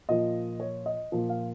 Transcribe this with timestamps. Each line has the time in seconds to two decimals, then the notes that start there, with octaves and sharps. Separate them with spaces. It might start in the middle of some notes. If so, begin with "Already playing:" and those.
0.09 A#2 F3 D#5
0.60 C#5
0.86 D#5
1.12 A#2 F3
1.29 F5